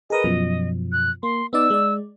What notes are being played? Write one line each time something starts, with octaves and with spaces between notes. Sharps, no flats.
G#4 A#4 B4 D#5
F#2 B2 F3
F#6
A#3 C6
B3 D#4 D5 E6
G#3 D5